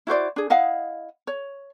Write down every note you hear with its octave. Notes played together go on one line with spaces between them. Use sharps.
E4 F#4 C5 D5
D4 G#4
E4 D#5 F5 F#5
C#5